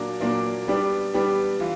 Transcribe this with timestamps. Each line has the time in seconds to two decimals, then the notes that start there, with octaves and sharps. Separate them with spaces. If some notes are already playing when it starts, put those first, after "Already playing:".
Already playing: A#2 F#3 A#3 D4
0.20 A#2 F#3 A#3 D4
0.67 G3 B3 D4 G4
1.14 G3 B3 D4 G4
1.60 E3 F4